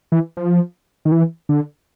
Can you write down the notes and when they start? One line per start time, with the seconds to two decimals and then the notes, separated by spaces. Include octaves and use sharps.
0.12 E3
0.37 F3
1.05 D#3
1.12 E3
1.49 D3